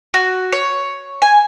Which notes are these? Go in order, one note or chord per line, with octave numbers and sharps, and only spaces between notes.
F#4
C#5
G#5